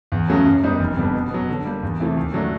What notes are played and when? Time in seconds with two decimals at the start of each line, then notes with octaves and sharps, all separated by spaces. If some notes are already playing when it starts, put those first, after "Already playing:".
0.12 E2
0.28 C#3 F#3 A3 C#4
0.45 F#2
0.63 D#3 G3 B3 D#4
0.79 F1
0.97 F2 D3 G3 B3
1.14 B2
1.31 F#3 B3
1.49 D3
1.65 G3 A#3
1.83 E2
2.00 C3 E3 A3
2.17 D#2
2.34 D3 F#3 A3 D4